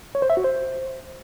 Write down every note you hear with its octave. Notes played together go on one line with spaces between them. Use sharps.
C#5
C5
E5
F#4
C5